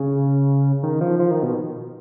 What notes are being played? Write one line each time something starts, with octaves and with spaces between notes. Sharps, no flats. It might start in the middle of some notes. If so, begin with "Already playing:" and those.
Already playing: C#3
D#3
F3
F3
D#3
B2